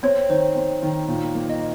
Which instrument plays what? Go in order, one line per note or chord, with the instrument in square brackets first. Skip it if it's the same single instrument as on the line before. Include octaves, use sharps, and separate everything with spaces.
[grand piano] C4 [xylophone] C#5
[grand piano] D#3 [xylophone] C5
[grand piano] C4
D#3
A#2
A#3
[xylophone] D#5